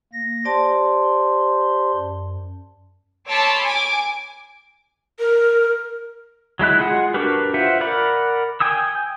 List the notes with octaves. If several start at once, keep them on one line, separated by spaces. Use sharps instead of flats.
A#3 A#6
G4 C5 D5 A5 C6
F#2
C#5 A5 B5 C6 D6 E6
G#5 D6 D7
A#4
F#3 G#3 E4 F#6
G#3 F4 G#4 F#5
D4 F#4 G4 A#4 B4
F4 C5 E5 F#5
A#4 D5 F#5 B5
G5 G#5 D#6 E6